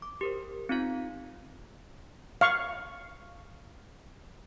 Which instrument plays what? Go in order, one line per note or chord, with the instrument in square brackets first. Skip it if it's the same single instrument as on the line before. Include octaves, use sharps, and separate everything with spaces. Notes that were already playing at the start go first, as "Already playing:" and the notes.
[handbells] D6
G4 A#4 C5
C4 D#4 F4 F5
[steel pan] F5 C#6